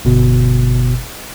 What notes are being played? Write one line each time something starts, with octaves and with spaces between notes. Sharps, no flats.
G1 B2